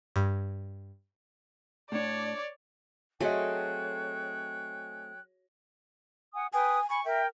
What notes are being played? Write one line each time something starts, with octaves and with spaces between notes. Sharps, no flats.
G2
A2 D4 C#5 D5
F#3 A3 C4 G#4 C#5 D#5 G5 F#6
F#5 G#5 D#6
B4 G5 G#5 D#6
G#5 B5 C#6
A#4 E5 G5